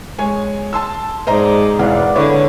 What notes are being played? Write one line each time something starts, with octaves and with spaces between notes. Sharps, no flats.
G#3 C#5 G#5
A5 C6 E6
G#2 C5 D5 D#5 A#5
E1 E3 D5 F5 F#5
D3 E4 B4 C#5